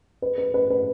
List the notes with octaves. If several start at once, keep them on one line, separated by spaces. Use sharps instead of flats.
B4
B4
B4
B4